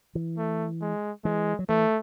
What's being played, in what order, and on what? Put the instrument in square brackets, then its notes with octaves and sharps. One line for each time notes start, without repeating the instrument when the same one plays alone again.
[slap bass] E3
[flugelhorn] A3
G#3
[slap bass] E3 [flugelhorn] G#3
[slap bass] F#3
[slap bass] E3 [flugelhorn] A3